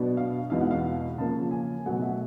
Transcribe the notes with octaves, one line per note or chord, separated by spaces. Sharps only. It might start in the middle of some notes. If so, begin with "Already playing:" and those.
Already playing: B2 F#3 B3 D4
F5
E2 B2 G#3 B3 D#4 F5
F#5
F5
C#3 F3 A#3 A5
G#5
B2 F#3 A3 F#5
E5